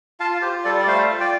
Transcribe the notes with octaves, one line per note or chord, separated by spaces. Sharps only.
F4 F5 A5
F4 G4 C5
G3 A4 D5
D5
A3 C5 F5
F4
D5 G5